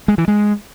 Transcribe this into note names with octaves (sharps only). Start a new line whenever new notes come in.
G#3
E3
G#3